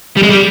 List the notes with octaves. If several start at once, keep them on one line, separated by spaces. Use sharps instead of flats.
G3
G#3
G3